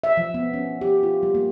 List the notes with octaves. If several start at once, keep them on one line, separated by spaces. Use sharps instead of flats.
E5
F3
B3
C#4
G4
F4
G3
A#3